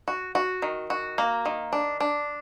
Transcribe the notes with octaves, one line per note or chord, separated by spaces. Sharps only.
F#4
F#4
D#3
F#4
A#3
D#3
D4
D4